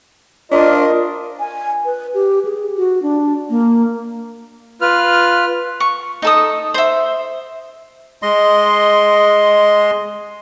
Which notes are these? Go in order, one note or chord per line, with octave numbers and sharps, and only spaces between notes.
D4 F4 A#4 D#5
G#5
B4
G4
G#4
F#4
D4
A#3
F4 B4 F6
C#6
D#4 A4 D#6
C5 E5
G#3 D#5 C6